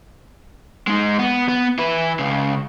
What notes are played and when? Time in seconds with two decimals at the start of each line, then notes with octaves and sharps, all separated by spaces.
0.87 G#3 D#4
1.19 B3
1.49 B3
1.79 E4 B4
2.19 C#2 C#3